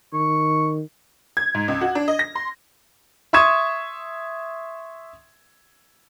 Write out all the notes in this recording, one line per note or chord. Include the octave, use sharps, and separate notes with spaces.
D#3 C#6
G#6
G#2
C#2
F#4
D4
D#5
A#6
C6
E5 C6 C#6 D#6 G#6 E7